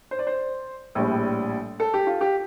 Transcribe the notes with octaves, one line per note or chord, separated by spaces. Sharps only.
C5
D5
C5
A#1 A2 G3
A4
G4
F4
G4